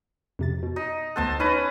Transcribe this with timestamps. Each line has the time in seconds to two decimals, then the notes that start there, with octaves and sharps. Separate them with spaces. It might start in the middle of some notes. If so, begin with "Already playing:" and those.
0.39 F2 C3 A6
0.63 B2
0.76 D#4
1.16 D2 B3 A4 C5 A5 F#6
1.40 C#4 D#4 B4 A#5